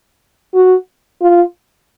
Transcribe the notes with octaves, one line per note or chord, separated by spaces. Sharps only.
F#4
F4